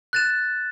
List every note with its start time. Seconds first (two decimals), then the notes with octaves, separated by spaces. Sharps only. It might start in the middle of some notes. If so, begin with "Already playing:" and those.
0.13 F#6 A6 E7